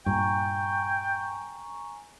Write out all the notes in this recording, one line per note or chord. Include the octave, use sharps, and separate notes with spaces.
G2 A#2 G5 G#5 A#5 C#6